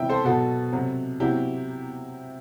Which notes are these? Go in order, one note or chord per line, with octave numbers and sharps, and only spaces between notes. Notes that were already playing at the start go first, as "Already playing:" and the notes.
Already playing: C3 E3 E5 G5
A4 C5
B2 F#3 F#4 A4
C3 F#3
C3 F#3 E4 G4